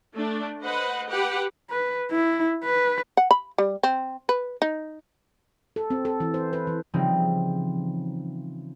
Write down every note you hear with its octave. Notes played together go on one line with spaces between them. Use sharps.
A3 D4
B4 C5 D#5 F#5
G4 B4 F#5
B4
E4
B4
F#5
B5
G3
C4
B4
D#4
A4
C4
A4
E3
C5
B4
E3
C#3 E3 F3 G3 C4 D#4